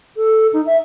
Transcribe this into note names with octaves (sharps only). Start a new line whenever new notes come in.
A4
D#4
E5